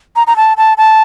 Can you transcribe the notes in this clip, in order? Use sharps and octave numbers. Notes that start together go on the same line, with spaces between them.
A#5
A#5
A5
A5
A5